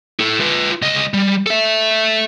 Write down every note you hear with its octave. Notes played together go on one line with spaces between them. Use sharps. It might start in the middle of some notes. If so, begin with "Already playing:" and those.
E4 A4
F4 B4
C#2 D#5
G3
A4 E5